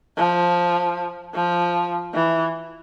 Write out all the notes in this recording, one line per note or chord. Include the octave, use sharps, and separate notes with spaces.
F3
F3
E3